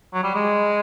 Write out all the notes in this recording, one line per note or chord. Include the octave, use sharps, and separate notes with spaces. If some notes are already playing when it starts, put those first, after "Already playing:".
F#3
G3
G#3